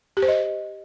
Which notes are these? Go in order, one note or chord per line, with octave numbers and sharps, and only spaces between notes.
G4
C5
D#5